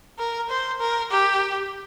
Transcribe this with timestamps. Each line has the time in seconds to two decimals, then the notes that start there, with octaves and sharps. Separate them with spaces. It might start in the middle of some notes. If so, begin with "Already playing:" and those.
0.19 A#4
0.50 C5
0.81 A#4
1.11 G4